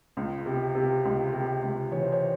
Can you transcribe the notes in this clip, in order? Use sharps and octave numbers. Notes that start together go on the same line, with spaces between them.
C#2
C3
C3
C#2
C3
C#2
E3 C#5
C5
C#5